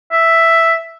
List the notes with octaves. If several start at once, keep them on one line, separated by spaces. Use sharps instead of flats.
E5